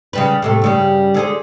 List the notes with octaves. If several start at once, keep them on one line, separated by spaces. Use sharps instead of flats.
C#3 G3 B4
A2 C3 A3
G2 C#3 G3
D3 G#4 C5